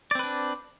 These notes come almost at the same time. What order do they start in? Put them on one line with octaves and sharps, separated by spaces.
D5 C4 B4 D4